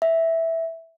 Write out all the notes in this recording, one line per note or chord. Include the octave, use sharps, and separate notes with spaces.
E5